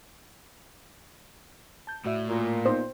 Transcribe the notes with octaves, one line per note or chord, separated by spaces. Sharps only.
A5 G6
A2 F#4 D5 E5
A#2
B3 D#4 C5